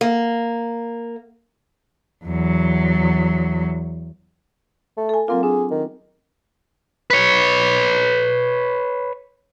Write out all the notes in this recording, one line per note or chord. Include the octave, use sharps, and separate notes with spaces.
A#3
E2 F#3
A3
A4 G#5
F#3 A#3 C4 F4
D4 G#4
D#3
B4 C#5